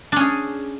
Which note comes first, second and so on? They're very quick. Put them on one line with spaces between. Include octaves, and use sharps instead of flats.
D4 C#4 G#4